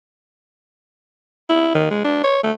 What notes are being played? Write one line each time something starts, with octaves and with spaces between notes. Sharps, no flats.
E4
D#3
G#3
D4
C#5
A3